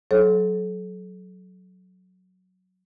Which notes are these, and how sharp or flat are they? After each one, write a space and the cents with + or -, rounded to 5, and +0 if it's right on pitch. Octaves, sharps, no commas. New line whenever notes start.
F#3 +0 A4 -35 C#5 -35